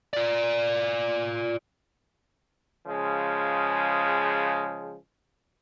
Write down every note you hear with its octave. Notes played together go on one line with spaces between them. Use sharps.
F4 D5
C#3 F3 G#3